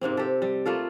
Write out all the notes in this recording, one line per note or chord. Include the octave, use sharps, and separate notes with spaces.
G#2 C3 A#3 C4
G4 A4
G3
A3 A#3 F4 A4